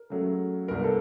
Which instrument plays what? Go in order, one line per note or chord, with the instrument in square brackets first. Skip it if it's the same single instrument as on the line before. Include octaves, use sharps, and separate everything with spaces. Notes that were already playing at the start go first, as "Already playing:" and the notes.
Already playing: [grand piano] A#4
[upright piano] C#3 F#3 A3
[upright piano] C2 A#2 G3 B3 D4 [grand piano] A#4
[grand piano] A4